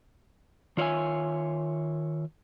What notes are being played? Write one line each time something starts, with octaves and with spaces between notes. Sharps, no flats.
D#3 F4 C#5 D5 E5 G#5